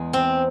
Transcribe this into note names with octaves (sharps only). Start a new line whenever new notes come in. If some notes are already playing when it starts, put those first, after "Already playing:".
Already playing: E2 G#3
C4